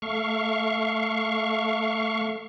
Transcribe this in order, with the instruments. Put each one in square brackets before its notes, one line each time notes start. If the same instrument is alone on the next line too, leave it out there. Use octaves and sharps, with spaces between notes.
[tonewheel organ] A3 F5 C#6